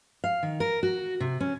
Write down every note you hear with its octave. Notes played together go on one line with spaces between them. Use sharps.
F5
D#3
A#4
F#4
C3
C#4